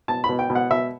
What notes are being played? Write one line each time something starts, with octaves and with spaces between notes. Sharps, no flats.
B2 A5
B5
B2
G5
B2
F#5
B2 E5